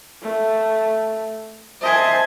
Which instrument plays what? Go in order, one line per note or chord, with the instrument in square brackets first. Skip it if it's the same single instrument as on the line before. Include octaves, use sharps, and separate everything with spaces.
[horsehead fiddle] A3
[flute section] C5 E5 A5 [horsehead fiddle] D#5 G#5